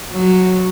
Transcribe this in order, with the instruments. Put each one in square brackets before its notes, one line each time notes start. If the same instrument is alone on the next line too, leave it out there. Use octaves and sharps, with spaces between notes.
[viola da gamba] F#3